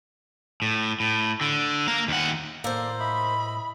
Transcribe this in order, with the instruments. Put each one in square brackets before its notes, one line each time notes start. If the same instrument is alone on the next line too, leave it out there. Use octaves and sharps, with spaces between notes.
[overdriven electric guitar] A2
A2
D3
A#3 F5
D#2 F#5
[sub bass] A2 [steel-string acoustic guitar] A#3 C5 [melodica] A4 D5
[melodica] D#5 E5 [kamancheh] B5